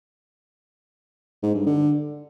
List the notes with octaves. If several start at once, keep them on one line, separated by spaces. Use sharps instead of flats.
G#2
G2
D3